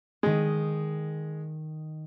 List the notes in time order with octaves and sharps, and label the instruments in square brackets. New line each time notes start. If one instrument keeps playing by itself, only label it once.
[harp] D#3 D#5 [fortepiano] G#3